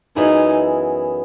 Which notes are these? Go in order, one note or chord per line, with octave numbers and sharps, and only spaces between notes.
F#2 E3 B3 D#4 E4 G#4